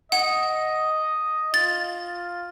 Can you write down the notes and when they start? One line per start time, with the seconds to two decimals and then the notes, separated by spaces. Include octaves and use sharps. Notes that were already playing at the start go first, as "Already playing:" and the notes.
0.12 D#5 F#5
1.54 F4 A6